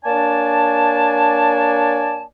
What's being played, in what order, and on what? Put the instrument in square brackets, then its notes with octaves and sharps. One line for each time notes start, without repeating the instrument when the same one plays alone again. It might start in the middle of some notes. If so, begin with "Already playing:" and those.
[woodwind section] A#3 D4 C#5 D5 G#5 A5